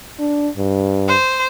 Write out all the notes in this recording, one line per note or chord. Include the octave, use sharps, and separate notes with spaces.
D4
G2
C5